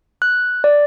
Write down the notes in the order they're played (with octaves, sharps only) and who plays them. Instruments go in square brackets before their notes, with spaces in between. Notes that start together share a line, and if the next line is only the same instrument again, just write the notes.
[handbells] F#6
D5